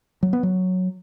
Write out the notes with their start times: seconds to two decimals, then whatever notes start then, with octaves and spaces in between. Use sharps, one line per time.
0.23 F#3
0.33 B3
0.43 F#3